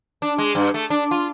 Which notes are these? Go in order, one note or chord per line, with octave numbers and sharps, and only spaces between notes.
D4
G#3
G2
A3
D4
F4